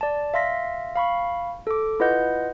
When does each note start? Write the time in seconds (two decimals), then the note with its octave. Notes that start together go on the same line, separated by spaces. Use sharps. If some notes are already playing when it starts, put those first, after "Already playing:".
0.01 D5 A5
0.34 E5 F5 C6 A#6 B6
0.95 F5 B5 C#6
1.67 A4 D6
2.00 E4 F4 B4 D#5 F#5 G6